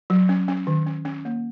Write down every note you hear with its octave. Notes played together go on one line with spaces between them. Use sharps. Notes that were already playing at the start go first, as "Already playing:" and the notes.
F#3
C#4
C#4
D#3
C#4
C#4
A#3